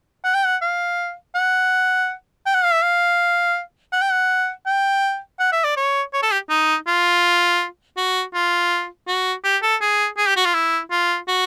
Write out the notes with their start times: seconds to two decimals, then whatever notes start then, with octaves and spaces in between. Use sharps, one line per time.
0.25 F#5
0.35 G5
0.45 F#5
0.62 F5
1.35 F#5
2.46 G5
2.55 F#5
2.64 F5
2.73 E5
2.82 F5
3.92 F#5
4.02 G5
4.12 F#5
4.66 G5
5.40 F#5
5.52 E5
5.64 D5
5.77 C#5
6.13 C#5
6.22 A4
6.32 G4
6.50 D#4
6.87 F4
7.97 F#4
8.34 F4
9.07 F#4
9.44 G4
9.63 A4
9.81 G#4
10.18 G#4
10.27 G4
10.36 F#4
10.45 F4
10.54 E4
10.91 F4
11.28 F#4